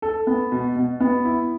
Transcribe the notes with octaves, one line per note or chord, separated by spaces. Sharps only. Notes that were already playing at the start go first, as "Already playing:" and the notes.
A4
B3
B2
B2
B3
E4